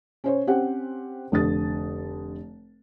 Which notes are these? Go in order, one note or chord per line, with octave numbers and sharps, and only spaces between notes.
C#4 C5 C#5
C4 C#4 G4 C5 F#5
F1 D3 D#6 A6